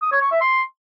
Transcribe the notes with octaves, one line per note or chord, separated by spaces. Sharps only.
D#6
C#5
C#6
E5
C6